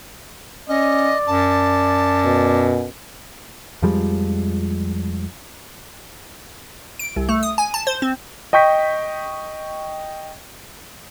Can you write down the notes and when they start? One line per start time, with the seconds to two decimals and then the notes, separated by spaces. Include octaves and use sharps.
0.69 C#4 D5 D#5
1.27 F#2 A5
2.24 B2
3.82 F2 F3 G3 G#3
6.99 D7
7.16 C2
7.29 A3
7.43 D#6
7.58 G#5
7.74 A5
7.87 C5
8.02 C4
8.53 D#5 G5 C#6 G6 B6